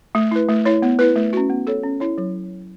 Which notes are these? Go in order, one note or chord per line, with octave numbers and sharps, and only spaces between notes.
A3
E4 B4
A3
E4 C#5
B3
E4 B4
A3
C#4 F#4
B3
A4 C#5
C#4
E4 C#5
F#3